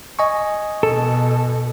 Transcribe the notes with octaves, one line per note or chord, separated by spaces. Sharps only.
D#5 G#5 C#6
B2 A4